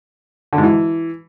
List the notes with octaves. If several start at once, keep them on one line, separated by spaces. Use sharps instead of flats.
D3
G#2
E3